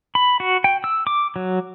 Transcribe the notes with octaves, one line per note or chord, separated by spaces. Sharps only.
B5
F#4
G5
E6
D6
F#3